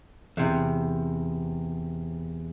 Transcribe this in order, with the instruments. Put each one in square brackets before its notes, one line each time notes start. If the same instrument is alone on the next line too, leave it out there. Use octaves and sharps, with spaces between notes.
[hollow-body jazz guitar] E2 C3